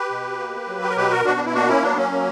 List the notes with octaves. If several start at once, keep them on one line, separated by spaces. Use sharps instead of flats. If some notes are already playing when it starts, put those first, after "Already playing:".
Already playing: G4 B4
B2
A#3
F#3
G4
A#4
B2 G4 B4
F#4 A#4
B2 D4 F#4
D4
E4
A#3 D4 F#4
C#4 E4
F#3 B3 D4
A#3 C#4
A#3